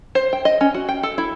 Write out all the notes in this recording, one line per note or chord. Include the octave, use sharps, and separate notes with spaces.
C5
G5
D#5
C#4
F#4
G5
A4
E4